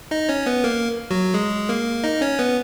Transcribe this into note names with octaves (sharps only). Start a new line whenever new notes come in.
D#4 D#5
C#4 C#5
B3 B4
A#3 A#4
F#3 F#4
G#3 G#4
A#3 A#4
D#4 D#5
C#4 C#5
B3 B4